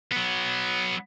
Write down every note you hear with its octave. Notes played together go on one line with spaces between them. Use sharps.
F#3 B3